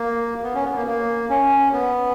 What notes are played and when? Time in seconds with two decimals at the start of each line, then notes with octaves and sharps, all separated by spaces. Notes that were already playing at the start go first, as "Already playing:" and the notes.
Already playing: A#3
0.43 B3
0.55 C#4
0.65 B3
0.76 A#3
0.87 A#3
1.30 C#4
1.73 B3